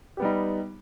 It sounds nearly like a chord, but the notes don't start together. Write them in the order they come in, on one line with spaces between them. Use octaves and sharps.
G4 B3 G3 D#4